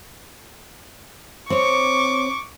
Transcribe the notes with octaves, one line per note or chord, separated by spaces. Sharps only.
C4 C#5 C#6 D6